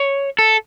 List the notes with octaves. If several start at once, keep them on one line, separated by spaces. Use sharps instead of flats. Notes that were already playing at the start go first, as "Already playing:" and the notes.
Already playing: C#5
A4